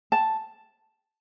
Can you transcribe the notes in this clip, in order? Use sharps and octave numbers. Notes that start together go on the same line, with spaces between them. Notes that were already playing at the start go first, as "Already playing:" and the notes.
A5